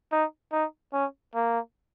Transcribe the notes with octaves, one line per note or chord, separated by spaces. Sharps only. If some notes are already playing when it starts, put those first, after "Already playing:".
D#4
D#4
C#4
A#3